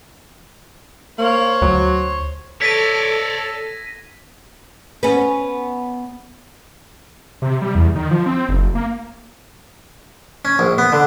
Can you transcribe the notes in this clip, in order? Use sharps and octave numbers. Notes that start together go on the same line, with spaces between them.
A#3 C5 C#5
D2 F#3
A4 C#5 D5 G#6 A#6 B6 D#7
B3 C#4
C3
G3
E2
D#3
F3
C4
F#1
A#3
C#4
A#1
B3
D3